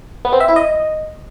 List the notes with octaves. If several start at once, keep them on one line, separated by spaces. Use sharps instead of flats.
B3
C4
E5
E4
D#5